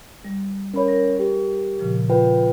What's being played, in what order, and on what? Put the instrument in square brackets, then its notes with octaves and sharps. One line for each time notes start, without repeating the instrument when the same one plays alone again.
[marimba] G3
[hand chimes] C#4 C#5 [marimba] A#4 B5
[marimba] A#4 A#6
[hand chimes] G4
[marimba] A#2 C#3 F3
[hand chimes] F4 B4 G5